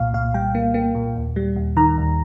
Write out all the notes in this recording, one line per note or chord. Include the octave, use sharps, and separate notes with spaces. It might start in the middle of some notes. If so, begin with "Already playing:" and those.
Already playing: C2 A#2 F5
A#2 F5
G3 G5
A#3
A#3
A#2
D#2
G3
D#2
D#3 A#5
D#2